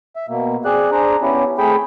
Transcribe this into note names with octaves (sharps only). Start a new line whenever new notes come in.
E5
B2 A#3
C4 G#4 D5 F#6
D4 G#4 C5 A#5
B3 C#4 E4 G4
A3 C4 G#4 G5 B5